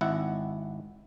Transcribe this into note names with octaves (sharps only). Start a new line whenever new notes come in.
G#1 E4 F#5